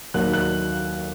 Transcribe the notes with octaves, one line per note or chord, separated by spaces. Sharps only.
D#2 D#3 F#3 F#6
F#6